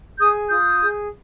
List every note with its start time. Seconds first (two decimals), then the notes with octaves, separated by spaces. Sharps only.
0.19 G#4 D#6 G6
0.50 F4 D#6 G6
0.81 G#4